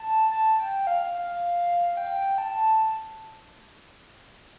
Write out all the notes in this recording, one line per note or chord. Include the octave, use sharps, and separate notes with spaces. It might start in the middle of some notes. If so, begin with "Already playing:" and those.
Already playing: A5
A5
G5
F5
F5
G5
A5